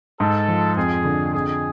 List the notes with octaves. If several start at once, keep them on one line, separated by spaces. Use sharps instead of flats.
G#2 A4
F3
F2 G#4
D3
F2 G#4